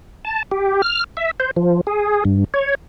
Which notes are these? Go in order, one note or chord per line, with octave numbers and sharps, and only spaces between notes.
A5
G4
F6
E5
C5
F3
G#4
G2
C#5